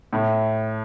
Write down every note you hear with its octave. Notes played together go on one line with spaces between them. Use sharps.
A2